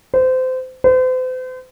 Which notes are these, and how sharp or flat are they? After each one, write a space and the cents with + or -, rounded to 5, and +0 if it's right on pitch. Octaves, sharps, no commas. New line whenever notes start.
C5 -25
C5 -40